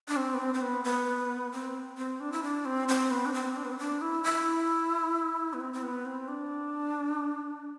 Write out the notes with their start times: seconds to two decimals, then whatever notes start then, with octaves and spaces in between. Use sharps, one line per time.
0.08 D4
0.17 C4
0.34 B3
0.39 C4
0.54 C4
0.62 B3
0.84 B3
1.52 C4
1.98 C4
2.20 D4
2.32 E4
2.43 D4
2.65 C4
2.88 C4
3.11 B3
3.26 D4
3.34 C4
3.56 D4
3.64 B3
3.72 C4
3.79 D4
4.01 E4
4.24 E4
5.53 B3
5.61 C4
5.73 C4
5.83 B3
6.06 C4
6.28 D4